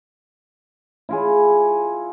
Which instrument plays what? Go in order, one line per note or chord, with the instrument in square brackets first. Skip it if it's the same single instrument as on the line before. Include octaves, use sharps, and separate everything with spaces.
[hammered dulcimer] E4 F4 G#4